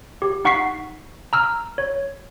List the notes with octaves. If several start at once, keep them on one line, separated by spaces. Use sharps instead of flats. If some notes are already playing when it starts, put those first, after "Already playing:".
G4
D#4 F#5 C#6 B6 C7
A#5 E6 F6
C#5